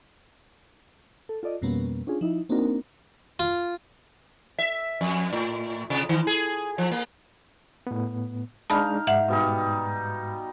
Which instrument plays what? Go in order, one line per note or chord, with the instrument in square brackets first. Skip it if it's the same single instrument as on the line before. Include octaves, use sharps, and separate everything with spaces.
[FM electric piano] A4
F4 A4 D5 D#5
F2 B2 G3 A#3 B3 C#4
C#4 D4 F4 G#4
F3 D#4 E4
A#3 C4 D4 D#4 F#4 A#4
[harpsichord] F4
[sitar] E5
F2
A2
C3
D#3
G#4
F3
A#3
[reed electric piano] A2 B3
[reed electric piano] G#3 D4 [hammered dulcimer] D#4 F5 [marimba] A5 B5
[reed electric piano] G#2 [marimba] E5 F#5
[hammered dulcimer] B2 G3 D#4